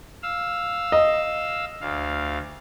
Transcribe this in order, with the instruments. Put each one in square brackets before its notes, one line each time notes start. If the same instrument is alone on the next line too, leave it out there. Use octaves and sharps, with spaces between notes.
[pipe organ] F5 E6
[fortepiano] D#5
[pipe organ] D2 F5